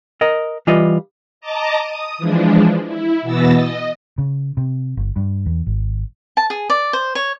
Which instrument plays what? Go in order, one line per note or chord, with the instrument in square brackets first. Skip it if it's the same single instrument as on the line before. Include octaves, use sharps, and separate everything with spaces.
[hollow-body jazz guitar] A#4 D#5
E3 G3 F4 B4 D#5
[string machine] D#5 A5 A#5 D6
D#6
E3 F3 G#3 D4
E4
B2 E3 B3 E6 A6 A#6
D#5
[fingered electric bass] C#3
C3
G1
G2
E2
G#1
[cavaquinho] A5
G#4
D5
C5
C#5